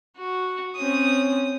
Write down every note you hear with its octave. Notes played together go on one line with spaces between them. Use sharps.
F#4
C4 C#4 D#6